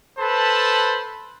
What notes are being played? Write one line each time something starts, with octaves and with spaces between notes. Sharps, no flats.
A4 B4 C5 A5 B5